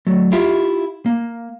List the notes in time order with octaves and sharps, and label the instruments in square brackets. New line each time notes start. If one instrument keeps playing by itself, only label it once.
[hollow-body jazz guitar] F#3 A3
E4 F4 G4 E5
A#3